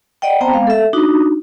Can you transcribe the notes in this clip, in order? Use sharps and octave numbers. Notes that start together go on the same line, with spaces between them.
D5 D#5 F#5 G5
B3 C4 C5 G5 A5 A#5
G#3 B3 F5
A4 E5
D4 D#4 F#4